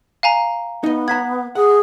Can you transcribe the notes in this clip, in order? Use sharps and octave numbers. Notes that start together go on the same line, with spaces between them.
F5 G#5 A#5
B3 D#4 D#5
F#5 A#5 G#6 B6
G#4 F#5